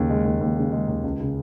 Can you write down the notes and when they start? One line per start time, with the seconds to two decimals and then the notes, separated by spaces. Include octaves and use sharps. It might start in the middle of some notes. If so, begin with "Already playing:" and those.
Already playing: D#2 C#3
0.10 G#3
0.25 D#2
0.41 D#2
0.56 C#3
0.72 G#3
0.88 D#2
1.03 C#2
1.20 C#3